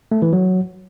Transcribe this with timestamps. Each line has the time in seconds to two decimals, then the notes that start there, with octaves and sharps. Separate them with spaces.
0.11 A3
0.22 E3
0.33 F#3